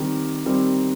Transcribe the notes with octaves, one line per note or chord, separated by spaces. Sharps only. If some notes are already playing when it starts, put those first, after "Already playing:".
Already playing: D#3 G3 C4 G4 A#4
D#3 G3 C4 G4 A#4